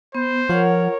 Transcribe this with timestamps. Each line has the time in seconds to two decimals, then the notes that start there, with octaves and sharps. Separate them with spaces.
0.15 B3 C5
0.49 F3 F4 A#4 C#5 F#5